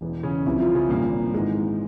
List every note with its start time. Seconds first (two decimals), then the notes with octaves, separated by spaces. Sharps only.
0.01 E1 E2 E3
0.23 C#3 C#4
0.46 C2 C3 E3 F3 E4
0.60 F3 F4
0.74 C#3 C#4
0.89 G#1 G2 A#2 F3 A#3
1.33 G#1 G#2 E3 G#3